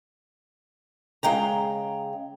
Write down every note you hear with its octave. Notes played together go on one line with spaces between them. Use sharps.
C#3 G#3 G5 A#5